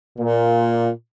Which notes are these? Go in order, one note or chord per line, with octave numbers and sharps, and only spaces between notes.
A#2